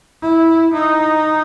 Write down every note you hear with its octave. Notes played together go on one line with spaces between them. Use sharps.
E4
D#4